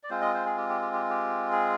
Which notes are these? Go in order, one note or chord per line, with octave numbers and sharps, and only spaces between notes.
D5
G#3 C4 F4 C5
D#5
C5
G#4
G4
G4
G4
G4
G4
G#4